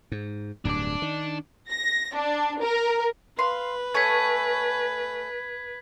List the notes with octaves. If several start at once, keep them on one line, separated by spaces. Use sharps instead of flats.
G#2
D1 G2 D4 D5
D#3
A#6
D4
A#4
B4 F5 C6
A3 C#5 G#5 G#6 B6